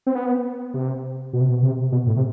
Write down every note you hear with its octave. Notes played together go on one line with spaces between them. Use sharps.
C4
B3
C3
B2
C3
B2
C3
B2
A2
C3